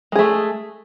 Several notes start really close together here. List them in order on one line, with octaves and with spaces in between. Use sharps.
G#3 G#4 A3